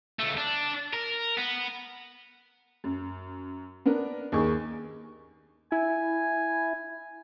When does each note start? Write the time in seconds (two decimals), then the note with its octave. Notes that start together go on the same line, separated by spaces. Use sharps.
0.20 C#2 A3
0.37 D4
0.93 A#4
1.37 B3
2.84 F#2
3.85 B3 D4 A#4
4.32 D#2 D#4 G#4 C#6
5.72 E4 G#5